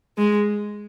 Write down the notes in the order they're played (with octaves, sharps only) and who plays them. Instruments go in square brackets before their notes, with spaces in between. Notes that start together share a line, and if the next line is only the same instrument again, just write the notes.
[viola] G#3